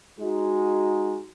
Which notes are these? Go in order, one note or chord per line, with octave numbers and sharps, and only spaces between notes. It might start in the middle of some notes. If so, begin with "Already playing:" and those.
G#3 D#4 F#4